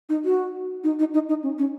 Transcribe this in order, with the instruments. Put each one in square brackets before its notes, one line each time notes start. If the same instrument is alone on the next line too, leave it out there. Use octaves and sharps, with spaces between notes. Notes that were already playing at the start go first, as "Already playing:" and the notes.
[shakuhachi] D#4
F#4
D#4
D#4
D#4
D#4
C#4
C#4